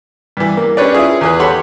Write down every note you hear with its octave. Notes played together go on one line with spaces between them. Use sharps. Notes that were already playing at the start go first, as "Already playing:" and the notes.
G2 E3
A#3
C#4 D4 G4 B4 C#5 D5
E4 F4 G#4
E2 G#4 B4
G4 A4 C#5 F#5 B5 C6